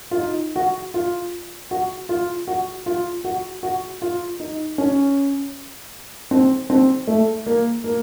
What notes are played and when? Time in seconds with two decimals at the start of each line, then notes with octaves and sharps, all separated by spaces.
0.11 F4
0.18 D#4
0.56 F#4
0.94 F4
1.71 F#4
2.09 F4
2.48 F#4
2.86 F4
3.24 F#4
3.63 F#4
4.02 F4
4.40 D#4
4.78 C#4
6.31 C4
6.70 C4
7.07 A3
7.46 A#3
7.84 A#3